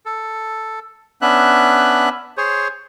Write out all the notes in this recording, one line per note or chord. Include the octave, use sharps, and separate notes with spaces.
A4
B3 C#4 D4 E5 F#6
G#4 C5 C#5